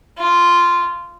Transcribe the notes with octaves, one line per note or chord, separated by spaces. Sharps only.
F4